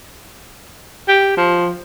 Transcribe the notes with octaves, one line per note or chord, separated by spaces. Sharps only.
G4
F3